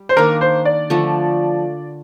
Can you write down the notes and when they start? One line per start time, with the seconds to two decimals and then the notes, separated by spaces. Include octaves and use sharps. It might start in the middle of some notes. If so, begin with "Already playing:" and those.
Already playing: G3
0.09 C5
0.17 D#3 A#3 D4 A#4
0.41 C5
0.65 D5
0.90 D3 F3 A3